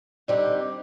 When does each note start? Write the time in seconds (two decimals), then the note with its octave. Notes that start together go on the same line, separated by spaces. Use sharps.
0.28 D3 G3 C4 D#4 G4